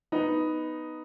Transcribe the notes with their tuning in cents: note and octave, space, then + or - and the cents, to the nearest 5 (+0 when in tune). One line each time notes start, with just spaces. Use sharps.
B3 +0 D#4 +0